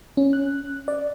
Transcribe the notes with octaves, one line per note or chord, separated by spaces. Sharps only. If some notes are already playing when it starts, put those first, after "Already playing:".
C#4
F#6
D5